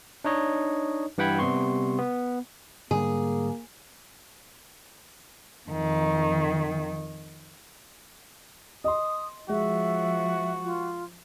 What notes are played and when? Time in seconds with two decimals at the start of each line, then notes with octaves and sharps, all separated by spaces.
0.24 D4 D#4 C#5 D#5
1.18 G2 E3 F#5 G5 B5 G#6
1.39 C3 G3 B3 C6 C#6
1.99 B3
2.91 G#2 D3 G3 A#3 G#4
5.70 F2 D#3
8.84 D#5 C6 D#6
9.49 F3 G#3 F#4 E5
10.64 F4